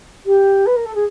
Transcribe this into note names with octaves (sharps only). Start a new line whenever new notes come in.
G4
B4
A#4
A4
G#4